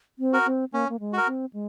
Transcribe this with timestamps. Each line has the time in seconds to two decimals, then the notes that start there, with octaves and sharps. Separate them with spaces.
0.19 C4
0.33 F#4 A#4
0.46 C4
0.73 A#3 C#4
0.89 A#3
1.00 G#3
1.13 F#4 A#4
1.27 C4
1.53 G#3